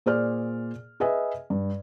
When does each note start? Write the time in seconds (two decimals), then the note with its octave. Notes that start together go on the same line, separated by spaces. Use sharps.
0.06 A#2 G#4 C5 D5 F6
1.00 G#4 B4 D#5 E5 G#5
1.50 G2